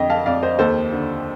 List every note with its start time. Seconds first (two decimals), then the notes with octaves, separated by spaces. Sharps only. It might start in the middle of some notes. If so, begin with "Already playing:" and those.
Already playing: F2 D3 D#5 G5
0.10 F5 A5
0.26 F2 D5 F5
0.42 C5 D#5
0.59 D#2 A4 C5
0.93 D3